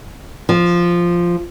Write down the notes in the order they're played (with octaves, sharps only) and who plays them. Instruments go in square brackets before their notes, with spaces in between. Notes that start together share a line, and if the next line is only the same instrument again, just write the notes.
[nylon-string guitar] F3